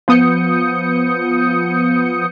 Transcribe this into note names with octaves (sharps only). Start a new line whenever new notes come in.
F3 B3 D#6 G6 C#7